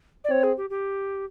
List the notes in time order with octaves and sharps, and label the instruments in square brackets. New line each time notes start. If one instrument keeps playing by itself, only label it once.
[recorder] D5
[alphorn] C4 [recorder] C#5
[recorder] G#4
G4
G4